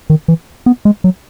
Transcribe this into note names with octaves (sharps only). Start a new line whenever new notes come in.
D#3
E3
B3
G#3
F#3